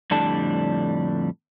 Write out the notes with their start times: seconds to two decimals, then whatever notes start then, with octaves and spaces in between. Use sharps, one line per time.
0.11 F2 A2 D3 G3 D4 A5